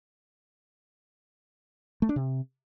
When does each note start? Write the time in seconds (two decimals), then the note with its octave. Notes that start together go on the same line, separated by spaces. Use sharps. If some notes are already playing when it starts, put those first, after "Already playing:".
2.02 A3
2.09 D4
2.16 C3